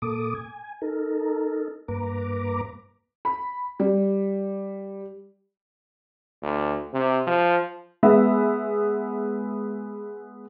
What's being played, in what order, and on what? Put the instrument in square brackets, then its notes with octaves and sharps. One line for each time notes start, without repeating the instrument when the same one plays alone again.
[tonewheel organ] A#2 A#3 A4 D6 D#6
G#5
D#4 A4 A#4
G2 A#3 B4 A#5 D6
[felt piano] B5
G3
[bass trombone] D2
C3
F3
[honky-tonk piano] G#3 B3 E5